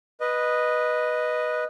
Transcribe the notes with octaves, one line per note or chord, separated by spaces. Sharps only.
B4 D#5